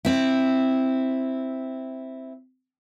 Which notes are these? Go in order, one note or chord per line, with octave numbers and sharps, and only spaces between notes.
C4 E4